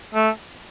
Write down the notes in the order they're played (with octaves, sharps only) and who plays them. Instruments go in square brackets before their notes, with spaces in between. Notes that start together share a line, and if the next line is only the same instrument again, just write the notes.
[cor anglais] A3